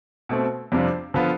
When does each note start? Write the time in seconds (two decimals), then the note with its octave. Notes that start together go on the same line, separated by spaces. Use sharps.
0.29 B2 A3 C4
0.72 F2 C3 G3 D4 F4
1.14 D3 F3 B3 F4